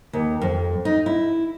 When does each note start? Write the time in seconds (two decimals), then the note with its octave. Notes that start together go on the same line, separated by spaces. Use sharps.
0.13 D#2
0.41 F2
0.85 D#4
1.06 E4